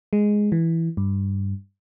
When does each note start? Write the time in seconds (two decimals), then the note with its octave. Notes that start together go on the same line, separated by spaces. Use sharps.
0.13 G#3
0.52 E3
0.97 G2